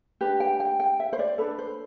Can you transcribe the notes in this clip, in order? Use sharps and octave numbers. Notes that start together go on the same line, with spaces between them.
D4 G4 B4
G5
G5
G5
E5
C5
D5
D4 A4 B4
C5